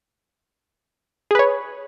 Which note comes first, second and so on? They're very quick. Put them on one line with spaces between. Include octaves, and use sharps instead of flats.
G#4 B4 C#5